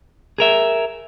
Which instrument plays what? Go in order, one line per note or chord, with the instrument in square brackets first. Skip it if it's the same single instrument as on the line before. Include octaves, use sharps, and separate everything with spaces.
[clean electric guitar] G#4 A#4 E5